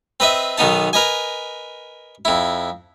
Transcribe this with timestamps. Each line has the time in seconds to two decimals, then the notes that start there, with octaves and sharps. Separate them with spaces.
0.20 C4 B4 D#5 E5
0.58 B1 D#3 B3 D#4 A5
0.93 A#4 B4 D#5 G#5
2.25 F2 E4